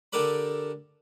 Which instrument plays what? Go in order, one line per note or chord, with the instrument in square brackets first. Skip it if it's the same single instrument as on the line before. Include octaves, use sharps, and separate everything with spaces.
[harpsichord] D3 G4 A4 A#4 D5 B5